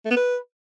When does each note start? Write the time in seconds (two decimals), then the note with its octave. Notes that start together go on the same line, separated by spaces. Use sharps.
0.05 A3
0.11 B3
0.16 B4